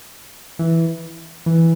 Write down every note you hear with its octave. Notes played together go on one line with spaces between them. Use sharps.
E3
E3